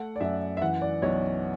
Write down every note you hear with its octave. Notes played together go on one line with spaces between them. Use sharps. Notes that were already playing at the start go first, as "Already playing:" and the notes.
Already playing: A3 F#5
D5
F#2 E5
E5
E3 F#5
D5
B1 C#5